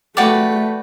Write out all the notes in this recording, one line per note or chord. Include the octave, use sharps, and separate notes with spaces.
A3 F#4 B4 D5 G5